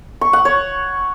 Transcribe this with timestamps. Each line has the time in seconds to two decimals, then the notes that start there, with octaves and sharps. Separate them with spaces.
0.21 C#6
0.33 F#5
0.45 C#5